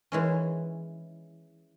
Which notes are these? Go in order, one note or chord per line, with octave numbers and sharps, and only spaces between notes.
E3 G#3 C#4